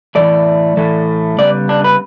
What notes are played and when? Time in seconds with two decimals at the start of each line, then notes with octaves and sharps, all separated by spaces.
0.15 A2 E3 A3 D5
0.77 A2 E3 A3
1.38 C#3 G3 B3 D5
1.69 D4
1.84 B4